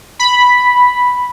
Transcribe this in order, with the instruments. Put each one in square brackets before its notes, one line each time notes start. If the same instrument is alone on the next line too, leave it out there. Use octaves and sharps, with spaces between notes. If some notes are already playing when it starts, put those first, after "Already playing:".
[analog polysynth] B5